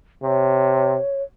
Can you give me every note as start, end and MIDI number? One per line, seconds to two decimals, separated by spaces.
0.23 0.97 48
0.23 1.23 73